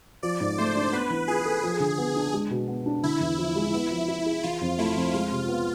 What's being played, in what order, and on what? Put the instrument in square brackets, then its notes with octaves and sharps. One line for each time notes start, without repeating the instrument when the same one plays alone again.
[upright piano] F3 [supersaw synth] D5
[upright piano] G#2
[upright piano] A3 [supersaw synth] C5
[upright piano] D4
[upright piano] B3 [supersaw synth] B4
[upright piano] E3
[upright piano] F4 [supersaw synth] G#4
[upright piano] A4
F3
D3
B3
D4
G#3
B2
B3
D4
[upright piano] D3 [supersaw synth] E4
[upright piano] E2
F3
G#3
[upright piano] B3 [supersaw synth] E4
[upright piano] F3
E4
G#4
[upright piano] E3 [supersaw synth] F4
[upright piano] F2
[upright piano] A3 [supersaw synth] E4
[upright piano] F2
[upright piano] G#3 [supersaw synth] F4
[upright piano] C3
B3